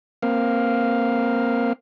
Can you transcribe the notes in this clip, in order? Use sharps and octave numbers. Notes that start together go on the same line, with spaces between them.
A#3 C4 F5